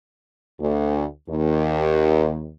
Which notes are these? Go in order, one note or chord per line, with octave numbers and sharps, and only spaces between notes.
D2
D#2